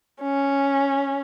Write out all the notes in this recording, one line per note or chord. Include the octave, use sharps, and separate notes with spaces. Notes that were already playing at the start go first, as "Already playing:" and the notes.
C#4